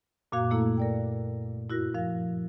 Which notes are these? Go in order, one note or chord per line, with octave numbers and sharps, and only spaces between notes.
F#2 A#2 A#3 F#4 F5 G#6
A3 A#3 E4 A4
A#4 D5 G5
G2 E4 F#4 A#4 A#6
F3 A#4 F5